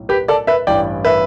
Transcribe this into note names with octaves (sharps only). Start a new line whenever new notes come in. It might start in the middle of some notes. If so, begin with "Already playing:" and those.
Already playing: B1 A2
G4 B4
A4 D5
B4 E5
A1 G2 E3 D5 G5
B4 E5